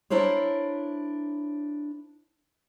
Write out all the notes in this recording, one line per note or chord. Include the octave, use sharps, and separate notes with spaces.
D4 E4 A#4 C5 C#5